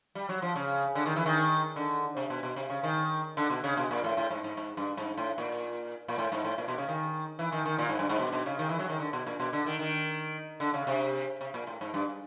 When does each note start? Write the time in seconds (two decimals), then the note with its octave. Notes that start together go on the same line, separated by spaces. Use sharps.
0.15 G3
0.29 F#3
0.42 F3
0.56 C#3
0.95 D3
1.06 D#3
1.16 E3
1.26 D#3
1.76 D3
2.17 C3
2.30 B2
2.43 B2
2.56 C3
2.70 C#3
2.83 D#3
3.37 D3
3.50 B2
3.64 C#3
3.77 B2
3.91 A#2
4.04 A2
4.17 A2
4.31 G#2
4.44 G#2
4.57 G#2
4.77 G2
4.97 G#2
5.17 A2
5.38 A#2
6.08 A#2
6.18 A2
6.32 G#2
6.45 A2
6.58 A#2
6.68 B2
6.78 C#3
6.89 D#3
7.39 E3
7.52 D#3
7.65 D#3
7.79 A#2
7.89 G#2
7.99 G2
8.09 G#2
8.19 B2
8.33 B2
8.46 C#3
8.59 D#3
8.69 E3
8.79 F#3
8.89 D#3
8.99 D3
9.13 B2
9.26 A#2
9.40 B2
9.53 D3
9.66 D#3
9.79 D#3
10.60 D3
10.74 C#3
10.87 C3
11.41 C3
11.54 A#2
11.67 A2
11.81 G#2
11.94 G2